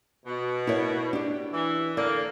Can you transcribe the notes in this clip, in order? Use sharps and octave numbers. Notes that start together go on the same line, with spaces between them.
B2
E4 A#4 C#5
D4 G4
E3
D3 A#3 D5